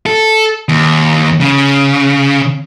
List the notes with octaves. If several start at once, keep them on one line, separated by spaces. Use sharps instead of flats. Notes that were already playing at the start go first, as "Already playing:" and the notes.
A4
D#2
C#3